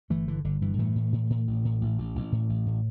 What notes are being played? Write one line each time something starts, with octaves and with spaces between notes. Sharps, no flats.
G1 E3 A3
D3 E3
G1 D3
G2 E3
A2 E3 A3
A2
A2
A2
A1
A2
A1
A1
A1
A2
A1
A2